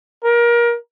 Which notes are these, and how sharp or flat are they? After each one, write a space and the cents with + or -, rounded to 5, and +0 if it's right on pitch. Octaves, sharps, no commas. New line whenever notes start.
A#4 +25